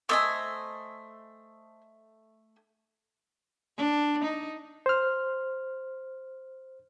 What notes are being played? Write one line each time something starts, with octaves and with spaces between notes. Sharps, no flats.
A3 C5 D#5 G#5 E6
D4
D#4
C5 F6